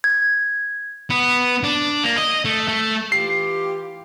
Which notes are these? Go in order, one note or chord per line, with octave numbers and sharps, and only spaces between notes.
G#6
B3
D4
A#3
D#5
A3
A3
E3 F4 G4 C7